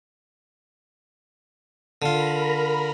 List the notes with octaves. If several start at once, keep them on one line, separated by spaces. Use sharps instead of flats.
D3 F4 A#4 A#5 B5